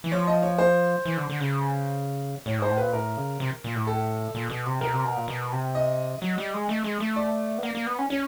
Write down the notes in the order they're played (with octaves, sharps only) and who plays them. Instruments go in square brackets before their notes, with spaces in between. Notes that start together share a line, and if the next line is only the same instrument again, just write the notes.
[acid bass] E3
[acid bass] F3 [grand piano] C#5
[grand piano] D#5
C#5
C5
[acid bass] E3
D3
D3
C#3
[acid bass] A2 [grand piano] C#5
[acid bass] G#2 [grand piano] C5
[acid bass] A2
[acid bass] A#2 [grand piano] B4
[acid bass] A2 [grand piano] A#4
[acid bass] C#3
C3
A#2
A2
[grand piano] A4
[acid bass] A#2
B2
C3
[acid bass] B2 [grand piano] A#4
[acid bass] C3
B2
A#2
B2
C3
[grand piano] D#5
[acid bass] F#3
G3
G#3
A3
G#3
A3
[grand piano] D5
[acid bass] B3
A#3
A#3
B3
C#4
[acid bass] C#4 [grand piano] C#5